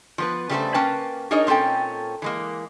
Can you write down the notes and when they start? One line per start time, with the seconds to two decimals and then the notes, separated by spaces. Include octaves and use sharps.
0.18 F3 B3 B4
0.49 C#3 G3 A3 F#4 A4 C5
0.74 A#3 C#4 B4 G5 A5
1.31 D4 D#4 G#4 A#4 C#5 D#5
1.47 A#2 C4 C#4 A4 G5
2.22 E3 G#3 A#3